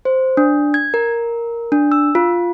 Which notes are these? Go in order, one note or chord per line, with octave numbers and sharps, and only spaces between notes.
C5
D4
G#6
A#4
D4
E6
F4